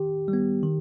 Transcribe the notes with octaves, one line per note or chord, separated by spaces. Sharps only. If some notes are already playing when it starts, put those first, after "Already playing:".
Already playing: D#3 G4
G3
B3
D#3